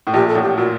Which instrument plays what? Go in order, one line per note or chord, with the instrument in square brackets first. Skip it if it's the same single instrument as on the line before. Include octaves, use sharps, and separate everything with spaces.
[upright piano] A2
[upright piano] A#1 A#2 [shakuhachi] G4
[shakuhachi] A4
[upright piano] A1 A2
[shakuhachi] G4
[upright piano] A#2 [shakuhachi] F#4